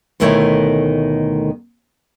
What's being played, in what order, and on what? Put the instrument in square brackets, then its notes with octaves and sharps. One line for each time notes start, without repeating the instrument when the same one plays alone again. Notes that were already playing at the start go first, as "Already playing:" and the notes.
[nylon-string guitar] D2 B2 D#3 A3 E4 C#5